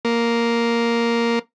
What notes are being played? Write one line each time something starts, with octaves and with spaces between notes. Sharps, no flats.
A#3